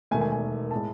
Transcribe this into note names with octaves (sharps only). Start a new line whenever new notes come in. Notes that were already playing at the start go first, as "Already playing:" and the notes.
E1 D#2 D#3 A3 G#5
G#5
G#5
A2 G#3 A5